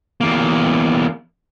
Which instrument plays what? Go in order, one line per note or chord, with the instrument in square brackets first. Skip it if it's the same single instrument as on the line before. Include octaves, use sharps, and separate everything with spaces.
[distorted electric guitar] E2 A#3